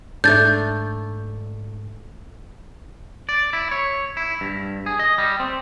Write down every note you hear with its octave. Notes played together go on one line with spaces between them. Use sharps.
G#2 A3 D4 G6 A6
D5
E4
C#5
E4
G2
G#4
D#5
G3
C4